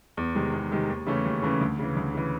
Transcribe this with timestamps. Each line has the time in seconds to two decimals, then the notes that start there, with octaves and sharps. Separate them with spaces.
0.17 E2
0.35 C3 D#3 G#3
0.54 E2
0.72 C3 D#3 G#3
0.90 D#2
1.06 C#3 E3 A3 C#4
1.25 D#2
1.42 C#3 E3 A3 C#4
1.61 D2
1.79 C#3 E3
1.97 D2
2.14 C#3 E3